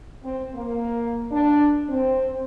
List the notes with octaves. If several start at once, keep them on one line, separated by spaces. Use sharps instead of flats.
C4
A#3
D4
C4